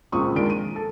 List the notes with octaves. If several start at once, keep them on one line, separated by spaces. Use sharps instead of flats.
C#2 A#2 F3 C4 C#6 D#6
D#3 F3 G#3 D4 D7
D#7
A4